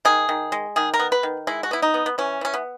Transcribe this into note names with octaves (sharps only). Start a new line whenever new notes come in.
D#3 G#4
D#3
G#3
D#3 G#4
A#4
B3
B4
D#3
G#3 E4
F#4
B3 E4
D#4
B3
B3
E3 C#4
E3 C#4
B3